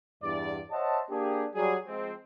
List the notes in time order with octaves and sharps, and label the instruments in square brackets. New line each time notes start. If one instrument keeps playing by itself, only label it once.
[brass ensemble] E2 G2 D5
C5 C#5 D#5 E5 F#5 A5
A#3 D4 G4 G#4
F#3 G3 G#4
F3 G#3 C4